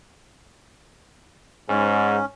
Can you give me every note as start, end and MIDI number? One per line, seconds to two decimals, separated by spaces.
1.69 2.18 44
1.69 2.25 61